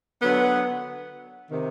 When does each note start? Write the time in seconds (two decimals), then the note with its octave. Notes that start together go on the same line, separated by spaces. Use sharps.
0.22 D3 F#3 B3
1.51 C3 D#3